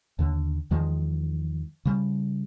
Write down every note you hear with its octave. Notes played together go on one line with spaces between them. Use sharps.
D#2 D3
E2 D#3 F3 G#3
C#3 G3